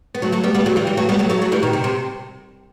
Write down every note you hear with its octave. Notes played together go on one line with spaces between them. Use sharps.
B3
F#3 A3
F#3 A3
G3 B3
G3 B3
F#3 A3
E3 G3
E3 G3
F#3 A3
G3 B3
F#3 A3
F#3 A3
F#3 A3
E3 G3
B2 D#3
C3
C3